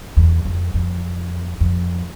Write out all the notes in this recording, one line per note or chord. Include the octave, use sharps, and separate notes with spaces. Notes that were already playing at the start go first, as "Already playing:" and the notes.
E2
F2
F2
F2